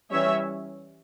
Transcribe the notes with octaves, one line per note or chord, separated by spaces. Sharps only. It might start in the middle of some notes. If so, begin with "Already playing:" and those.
E3 G3 C#4 C#5 E5